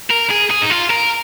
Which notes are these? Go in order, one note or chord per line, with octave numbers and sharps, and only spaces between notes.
A#4
G#4
G#4
D#4
F4
A#4